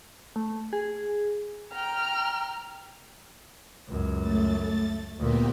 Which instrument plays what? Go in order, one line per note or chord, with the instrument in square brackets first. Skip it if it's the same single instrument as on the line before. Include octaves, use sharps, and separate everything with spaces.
[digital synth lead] A3
G#4
[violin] G5 A#5 [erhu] F6
[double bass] C#2 F#2
[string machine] A3 A6
[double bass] D2 A#2 [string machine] A#3 B3 G4